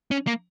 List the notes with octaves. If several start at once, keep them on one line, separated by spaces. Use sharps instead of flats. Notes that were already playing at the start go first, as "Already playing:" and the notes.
C#4
A#3